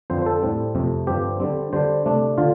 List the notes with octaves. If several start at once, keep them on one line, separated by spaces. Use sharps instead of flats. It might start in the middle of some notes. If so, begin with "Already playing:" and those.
F2 D3 F3 C4 C5
C5
A4
A2 G3 C4
F2 C3 A3
G2 D3 F3 C4 G4
D3 G3 C4
D3 G3 D4 C5
C3 A3 D4
D3 F4